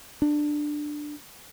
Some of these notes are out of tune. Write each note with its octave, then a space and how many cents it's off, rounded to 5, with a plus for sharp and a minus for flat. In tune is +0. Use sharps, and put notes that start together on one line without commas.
D4 +15